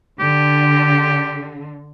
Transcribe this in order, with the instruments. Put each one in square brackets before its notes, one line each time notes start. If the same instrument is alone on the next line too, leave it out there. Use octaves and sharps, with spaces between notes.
[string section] D3 [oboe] G4